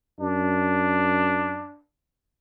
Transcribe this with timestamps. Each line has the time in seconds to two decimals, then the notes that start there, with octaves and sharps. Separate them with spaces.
0.20 F#2 D4